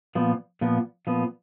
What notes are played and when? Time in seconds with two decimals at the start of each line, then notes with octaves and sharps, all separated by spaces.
0.15 A#2 F3 B3
0.61 A#2 F3 B3
1.07 A#2 F3 B3